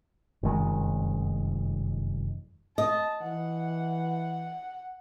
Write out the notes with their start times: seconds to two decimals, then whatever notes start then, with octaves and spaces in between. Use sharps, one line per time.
0.43 F1 F#2 D#3 G#3
2.78 D#5 A5
3.22 E3 F#5